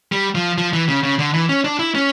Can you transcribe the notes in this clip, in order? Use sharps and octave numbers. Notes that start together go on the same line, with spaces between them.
G3
F3
F3
E3
C#3
C#3
D3
E3
C#4
D4
E4
C#4